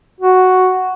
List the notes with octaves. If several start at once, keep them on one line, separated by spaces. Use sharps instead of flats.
F#4